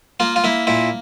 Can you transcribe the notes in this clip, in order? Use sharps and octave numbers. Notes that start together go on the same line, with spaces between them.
A#3 F4
F4
A#3 E4
A#2 E4